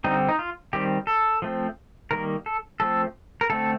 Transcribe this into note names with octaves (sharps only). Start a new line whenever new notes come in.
D3 G3 C4 D#4
D#4
F4
D#3 G3 C4 G4
A4
F3 A3 C4
D#3 G3 A#3 A#4
A4
F3 A3 C4 A4
A#4
D3 A3 C4 A4